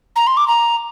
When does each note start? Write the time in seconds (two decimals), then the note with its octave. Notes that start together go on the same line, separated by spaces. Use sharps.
0.16 A#5
0.27 C6
0.37 D6
0.48 A#5